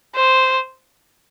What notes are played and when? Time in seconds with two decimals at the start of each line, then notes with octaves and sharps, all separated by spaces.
0.15 C5